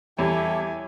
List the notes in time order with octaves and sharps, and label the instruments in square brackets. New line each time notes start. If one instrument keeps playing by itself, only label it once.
[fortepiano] E2 [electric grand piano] G3 G4 C#5 [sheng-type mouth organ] E4 A4 [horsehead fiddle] G#5